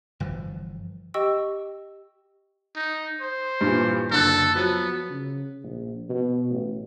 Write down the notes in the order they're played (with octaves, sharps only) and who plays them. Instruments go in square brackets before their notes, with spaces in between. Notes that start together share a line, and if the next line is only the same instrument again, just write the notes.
[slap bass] G1 E3 F3
[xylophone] G4 D#5 G5 C#6 E6
[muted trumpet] D#4
C5
[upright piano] G2 A#2 E3
[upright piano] F#1 D3 F#6 [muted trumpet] A4
[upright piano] F3 F#3 [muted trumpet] B3
[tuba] C#3
A#1
B2
A1